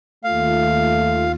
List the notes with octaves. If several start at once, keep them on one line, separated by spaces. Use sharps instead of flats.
D#2 A3 F4 F5